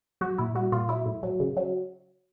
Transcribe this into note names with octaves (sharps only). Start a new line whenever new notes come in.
F#3 F#4
A#2 E4
G3 F#4
A#2 F4
F#3 E4
A2
F#3
C#3
F#3